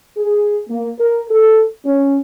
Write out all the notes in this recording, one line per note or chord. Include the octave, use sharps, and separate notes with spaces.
G#4
A#3
A#4
A4
C#4